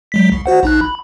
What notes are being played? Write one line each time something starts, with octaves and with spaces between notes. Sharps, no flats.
F#3 G#3 B6
C2
F#4 C5 F#5
A#1 D#4 F#6
B5